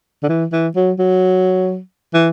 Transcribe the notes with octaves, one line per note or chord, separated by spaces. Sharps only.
D3
E3
E3
F#3
F#3
E3